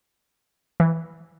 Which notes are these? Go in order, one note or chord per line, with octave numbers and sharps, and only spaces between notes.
E3